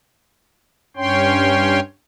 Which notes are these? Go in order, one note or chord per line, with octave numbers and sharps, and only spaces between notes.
G2 C#4 C#5 G5 C6